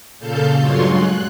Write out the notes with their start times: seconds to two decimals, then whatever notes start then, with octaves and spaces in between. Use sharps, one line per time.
0.19 A#2 C#3 A4 F5 A5 G6
0.57 G2 F#3 G#3 F4 C#5 C6
0.91 F#6